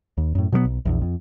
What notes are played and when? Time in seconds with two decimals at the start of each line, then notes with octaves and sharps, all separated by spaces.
0.18 D#2
0.35 F#2 A2
0.52 B2 F#3 G3 B3
0.64 B1
0.85 A#1 E2
1.01 F2